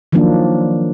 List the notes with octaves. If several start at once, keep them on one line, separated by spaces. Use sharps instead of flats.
D#3 F3 F#3 A#3 D4